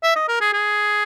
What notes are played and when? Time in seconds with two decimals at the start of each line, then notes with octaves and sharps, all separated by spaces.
0.03 E5
0.16 D#5
0.28 A#4
0.41 G#4
0.53 G#4